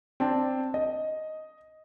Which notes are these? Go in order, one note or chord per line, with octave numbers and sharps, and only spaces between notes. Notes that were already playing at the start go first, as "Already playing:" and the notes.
C4 D4 A5
D#5